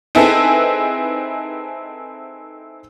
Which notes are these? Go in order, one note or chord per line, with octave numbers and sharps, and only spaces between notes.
C4 D#4 E4 G#4 A4 B4